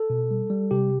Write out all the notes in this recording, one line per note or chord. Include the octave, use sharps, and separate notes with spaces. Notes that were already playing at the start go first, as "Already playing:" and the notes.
Already playing: A4
B2
G3
G3
C3 G4